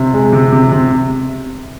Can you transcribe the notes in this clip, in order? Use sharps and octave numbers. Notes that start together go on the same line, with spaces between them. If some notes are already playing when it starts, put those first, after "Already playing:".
Already playing: C3
G#3
C3
C3
C3